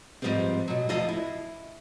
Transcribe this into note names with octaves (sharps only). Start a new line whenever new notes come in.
G#2 C#3 F3 G3 B3 C4
B2 F#3
D2 F3 D5 D#5 F5
E4